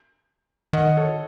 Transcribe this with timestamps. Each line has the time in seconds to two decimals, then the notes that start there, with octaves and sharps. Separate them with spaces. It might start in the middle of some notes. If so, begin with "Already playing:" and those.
0.73 D#3 D#5 F#5
0.97 A4 C#5